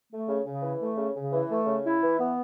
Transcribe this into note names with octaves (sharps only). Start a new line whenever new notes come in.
A3
C#3
C#3
E3
A3
C#3
C#3
E3
A3
C#3
E4
E3
B3